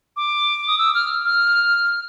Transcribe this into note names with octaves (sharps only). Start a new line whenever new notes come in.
D6
D#6
E6
F6
F6